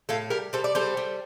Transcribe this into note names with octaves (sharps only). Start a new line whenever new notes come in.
A2 F4 A4
G3 G4 A#4
G3 A4 C5
D5
G3 A4 C5
G3